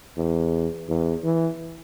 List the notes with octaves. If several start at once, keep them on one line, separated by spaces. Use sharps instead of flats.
E2
E2
E3